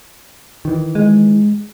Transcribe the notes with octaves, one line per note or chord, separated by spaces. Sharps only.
D#3 E3
G#3